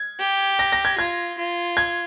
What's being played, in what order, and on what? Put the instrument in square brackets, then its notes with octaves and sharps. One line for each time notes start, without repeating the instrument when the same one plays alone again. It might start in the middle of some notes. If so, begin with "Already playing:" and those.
Already playing: [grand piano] G#6
[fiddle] G4
[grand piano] A#6
A#6
G#6
[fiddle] F4 [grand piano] G#6
[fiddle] F4
[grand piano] G#6